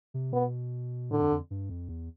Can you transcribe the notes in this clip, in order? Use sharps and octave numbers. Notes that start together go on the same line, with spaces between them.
C3
B2 B3
A2 D3
F2
F2
G2
F2
E2